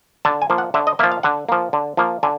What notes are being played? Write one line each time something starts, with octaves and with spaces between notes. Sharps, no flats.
D3 A5
G#5
F3 A#3
F#5
D3 E5
D#5
F3 A#3 E5
F5
D3 F#5
F3 A#3
D3
F3 A#3
D3 G#5